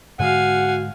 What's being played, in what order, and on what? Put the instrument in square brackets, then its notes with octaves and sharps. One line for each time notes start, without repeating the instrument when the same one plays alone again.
[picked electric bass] G#2 D3 G#3 [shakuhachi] F#4 [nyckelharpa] F5 G#5 [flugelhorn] F#5